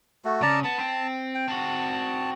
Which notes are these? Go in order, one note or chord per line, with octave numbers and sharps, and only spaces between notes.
A3 F#4
C#3 D5 A5 A#5
B3 A5
C4
G5
C4 F#4 A5